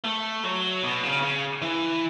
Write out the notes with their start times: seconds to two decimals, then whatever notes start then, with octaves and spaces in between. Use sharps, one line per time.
0.05 A3
0.44 F#3
0.83 B2
1.03 C#3
1.23 C#3
1.62 E3